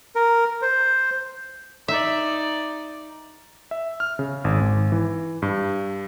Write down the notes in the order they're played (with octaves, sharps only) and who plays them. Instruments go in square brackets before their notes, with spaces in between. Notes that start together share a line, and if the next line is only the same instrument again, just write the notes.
[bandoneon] A#4
C5
[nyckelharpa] D#4 D5 [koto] E5
[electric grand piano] E5
F6
C#3
G#1
G#1
E3
G2